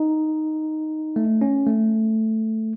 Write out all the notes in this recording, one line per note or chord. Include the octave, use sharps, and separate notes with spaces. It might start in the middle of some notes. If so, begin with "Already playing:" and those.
Already playing: D#4
A3
C#4
A3